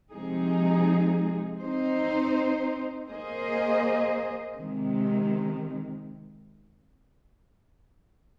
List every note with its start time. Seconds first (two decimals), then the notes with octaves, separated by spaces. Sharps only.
0.13 C3 F3 G#3 D#4 G#4
1.60 C4 D#4 C5
3.09 A#3 G#4 C5 D#5
4.57 C3 D#3 G#3